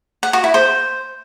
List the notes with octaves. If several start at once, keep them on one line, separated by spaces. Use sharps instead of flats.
F#5
F#4
E4
C5